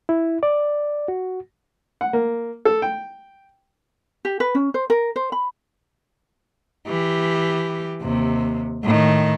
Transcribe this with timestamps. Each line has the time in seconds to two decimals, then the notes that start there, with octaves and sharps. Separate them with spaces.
0.09 E4
0.43 D5
1.08 F#4
2.01 F#5
2.13 A#3
2.65 A4
2.82 G5
4.25 G4
4.40 B4
4.55 C#4
4.74 C5
4.90 A#4
5.16 C5
5.32 B5
6.87 E3 G4
8.01 D#2 C3
8.83 A2 D#3